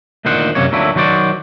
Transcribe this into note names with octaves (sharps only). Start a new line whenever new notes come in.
D2 A#2 D#3 C5 F#5
F#2 C3 F#3 A#3 C#5
D2 A#2 F#3 A3 E4
D#3 F#3 F#4 C5 D5